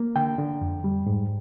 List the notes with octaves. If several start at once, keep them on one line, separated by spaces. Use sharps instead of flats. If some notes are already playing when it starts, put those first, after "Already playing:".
Already playing: A#3
D3 G5
D3
F2
G3
G#2